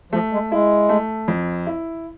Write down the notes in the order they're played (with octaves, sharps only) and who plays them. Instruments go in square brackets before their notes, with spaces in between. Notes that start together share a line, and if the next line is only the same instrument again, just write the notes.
[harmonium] F3 [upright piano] A3
[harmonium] G#3
[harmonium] G#3 [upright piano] E4
[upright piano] A3
F2
E4